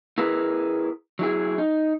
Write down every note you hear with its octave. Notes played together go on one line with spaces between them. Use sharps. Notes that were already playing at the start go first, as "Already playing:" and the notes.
E4 G#4 A#4 B4
F#3 E4 G#4
D#4